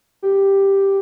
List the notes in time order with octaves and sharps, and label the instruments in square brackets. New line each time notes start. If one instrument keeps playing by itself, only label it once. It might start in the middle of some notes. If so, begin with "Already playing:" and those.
[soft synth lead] G4